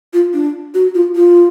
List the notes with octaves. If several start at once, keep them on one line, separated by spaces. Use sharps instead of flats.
F4
D4
F#4
F4
F4